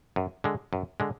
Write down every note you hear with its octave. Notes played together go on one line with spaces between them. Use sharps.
F#2
D3 G#3
F#2
D3 G#3